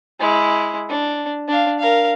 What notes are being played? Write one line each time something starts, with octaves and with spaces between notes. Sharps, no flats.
G#3 E4
D4
D4 F5
A#4 F5